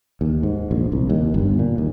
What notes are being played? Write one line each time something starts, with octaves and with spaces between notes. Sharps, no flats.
D#2
G#2
A#1
C2
D#2
G1
A#2
D#2